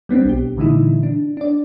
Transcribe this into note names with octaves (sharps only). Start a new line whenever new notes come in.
G3 B3 C4 D4
B1 G4
A#2 D3 E3 G#3 D#4 E4
D4
D4 D5